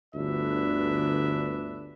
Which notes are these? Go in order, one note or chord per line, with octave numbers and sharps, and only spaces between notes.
G1 D2 D4 B4 E5